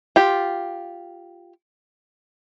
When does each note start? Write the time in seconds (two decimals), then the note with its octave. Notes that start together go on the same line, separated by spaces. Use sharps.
0.16 F4 G4